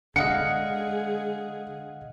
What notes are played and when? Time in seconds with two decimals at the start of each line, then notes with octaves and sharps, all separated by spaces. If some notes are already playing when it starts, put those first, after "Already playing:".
0.16 D3 G#3 G#4 D#5 F5 F#5 C#7